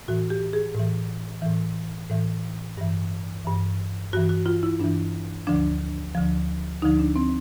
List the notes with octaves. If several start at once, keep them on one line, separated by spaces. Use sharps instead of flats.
A2 E3 F#4
G4
G#4
A2 E3
A2 E3
A2 E3
G2 E3
G2 E3
G2 E3 F#4
F#4
F4
E4
G2 E3 D4
D2 D3 F3 D4
D2 D3 F3
D2 D3 F3 D#4
D4
C4